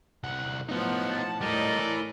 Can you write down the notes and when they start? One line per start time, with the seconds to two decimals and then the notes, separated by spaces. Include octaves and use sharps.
0.24 C2 F#5
0.69 A2 F3 B3 D#4 F#5
1.10 A5
1.41 A2 G3 D#4 A4 A#4 D5 D#5
1.80 E3